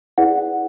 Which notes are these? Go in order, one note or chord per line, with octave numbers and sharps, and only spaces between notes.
E4 G#4 B4 D5 F#5